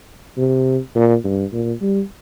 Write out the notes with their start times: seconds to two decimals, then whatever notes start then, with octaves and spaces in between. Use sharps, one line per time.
0.38 C3
0.95 A#2
1.24 G2
1.53 A#2
1.81 G3